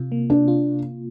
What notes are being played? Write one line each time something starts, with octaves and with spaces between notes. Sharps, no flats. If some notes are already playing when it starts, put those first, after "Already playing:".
Already playing: C3 F4
A#3
C3 D4
F4